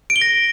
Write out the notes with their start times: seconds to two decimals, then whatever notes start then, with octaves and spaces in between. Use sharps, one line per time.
0.10 D7
0.16 G7
0.21 A#6